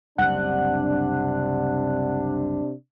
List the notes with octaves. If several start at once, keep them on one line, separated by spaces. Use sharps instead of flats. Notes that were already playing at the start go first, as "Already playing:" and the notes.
F#1 C2 C3 D4 F#5 F#6